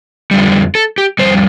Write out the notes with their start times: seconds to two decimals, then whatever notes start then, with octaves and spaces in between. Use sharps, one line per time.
0.31 F2 D3 G3
0.75 A4
0.98 G4
1.19 C3 G3 C5
1.23 F2